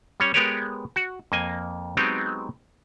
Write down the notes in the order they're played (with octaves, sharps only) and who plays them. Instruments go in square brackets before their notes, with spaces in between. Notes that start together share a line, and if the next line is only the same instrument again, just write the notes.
[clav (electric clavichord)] G3 C#4 C#5
G#3 B3 G4 A#4 B4 C#5
F#4
F2 A#3 D#5 G#5
F#3 G#3 B3 C4 D#4 G4